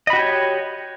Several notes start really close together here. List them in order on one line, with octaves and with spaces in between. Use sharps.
D#5 B5 F#4 G4 C#5